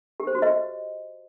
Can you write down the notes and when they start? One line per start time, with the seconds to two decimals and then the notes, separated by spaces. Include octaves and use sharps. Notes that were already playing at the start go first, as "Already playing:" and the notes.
0.20 G4
0.27 C5
0.35 F#4
0.42 D#5